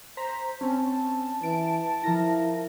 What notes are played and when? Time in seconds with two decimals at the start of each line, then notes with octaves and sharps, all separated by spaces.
0.17 C5 A#5 B6
0.61 C4 C#4 A5
1.43 E3 D7
2.04 F3 E4 A#4 A#6